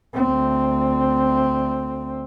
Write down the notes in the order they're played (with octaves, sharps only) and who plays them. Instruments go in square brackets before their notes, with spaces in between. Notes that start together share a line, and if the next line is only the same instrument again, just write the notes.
[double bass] D2 C4